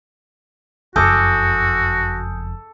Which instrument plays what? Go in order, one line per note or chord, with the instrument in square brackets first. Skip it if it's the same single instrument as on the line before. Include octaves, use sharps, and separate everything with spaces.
[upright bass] F#1 F2 [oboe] F#4 [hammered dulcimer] A4 D6 [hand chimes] G#5 D#6 G6